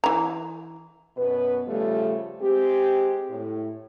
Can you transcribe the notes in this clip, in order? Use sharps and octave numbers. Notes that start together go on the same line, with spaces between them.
E3 A#5
F#2 B2 B3 B4
C#3 F3 G3 A3
G#3 C4 G4
A2